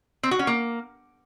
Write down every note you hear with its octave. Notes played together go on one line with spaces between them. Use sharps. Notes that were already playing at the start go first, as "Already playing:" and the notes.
C4
F#4
C#4
A#3